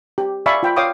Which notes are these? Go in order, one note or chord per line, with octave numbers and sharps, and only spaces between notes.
G4
D5 E5 F5 G#5 B5 C#6
F4 G5 B5
C#5 F5 G5 D6 D#6